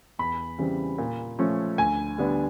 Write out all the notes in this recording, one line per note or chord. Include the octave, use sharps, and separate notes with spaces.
E2 B5
C#3 E3 G3 C4
A#2
F3 A3 C#4
D2 G#5
D3 G3 B3 D4